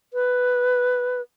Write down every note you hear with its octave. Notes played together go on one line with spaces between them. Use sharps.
B4